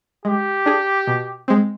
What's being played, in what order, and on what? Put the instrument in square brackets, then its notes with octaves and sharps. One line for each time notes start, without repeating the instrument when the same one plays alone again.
[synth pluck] G#3 [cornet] G4
[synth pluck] D4 G#4
B2
G#3 C4